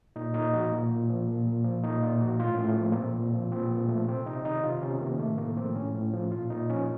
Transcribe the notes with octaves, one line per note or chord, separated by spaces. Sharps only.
A#2 D#4
A#2 D#4
F3 F#4
A#2
A#2
F3
A#2
A#2
F3
A#2 D#4
A#2 F4
F3 F#4
A2 F4
A2 C#4
A3
F3 A#3
A#3
A#2 C4
A#2
F3
A#2 C4
A#2
F3 A3
C3 C4
C3 D#4
D#3 D#4
C3 F4
C3 C#4
D#3 A#3
A2 A3
A2 A#3
F3 C4
A2 C#4
A2
F3
A#2 F4
A#2 D#4
F3 C#4